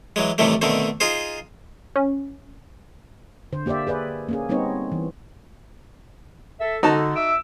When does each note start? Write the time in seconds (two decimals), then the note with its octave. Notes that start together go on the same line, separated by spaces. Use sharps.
0.16 E3 F#3 G#3
0.38 A2 C3 D#3 E3 G3 A3
0.62 B2 D3 D#3 A3 C4
1.00 D#4 F4 G#4 C5
1.96 C#4
3.52 D3 C5
3.66 A#3 G4 C5 D5 E5
3.87 G#4 B4 D5 E5
4.29 A#3 C#4 G#4
4.49 G3 B3 C4 D#4 C#5
4.92 E3
6.59 A4 E5
6.83 D3 D#4 F#4 A5
7.15 E5 D6 E6